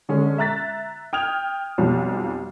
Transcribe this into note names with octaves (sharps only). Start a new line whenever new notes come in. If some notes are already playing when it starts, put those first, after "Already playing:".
D3 G#3 C#4
E5 A#5 F#6 A6 B6
G5 D#6 F6 G#6 F7
B1 F2 F3 G3